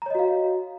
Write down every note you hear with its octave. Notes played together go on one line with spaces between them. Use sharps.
F#4 C#5 D#5 F5 A#5